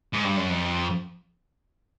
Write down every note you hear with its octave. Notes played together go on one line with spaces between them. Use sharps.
G#2
G2
F#2
F2